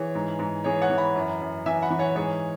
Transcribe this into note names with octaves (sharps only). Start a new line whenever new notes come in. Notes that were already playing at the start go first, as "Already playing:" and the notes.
Already playing: E3 G#4 C#5
G#2
G#2
E3 G#4 C#5
C#5 F#5
E3
F#5 B5
F#2
F#2
E3 E5 G#5
F#5 B5
E3
C#5 F#5
G#2 G#4 C#5